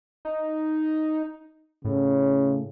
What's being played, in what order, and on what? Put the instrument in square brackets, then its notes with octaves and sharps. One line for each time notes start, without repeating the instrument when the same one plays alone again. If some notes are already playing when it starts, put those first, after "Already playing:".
[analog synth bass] D#4
[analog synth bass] A2 [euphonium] C#3